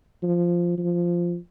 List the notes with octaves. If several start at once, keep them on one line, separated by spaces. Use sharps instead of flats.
F3
F3